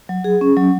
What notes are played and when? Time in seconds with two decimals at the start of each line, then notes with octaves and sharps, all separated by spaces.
0.09 F#3
0.24 G#4
0.41 C#4
0.57 F#3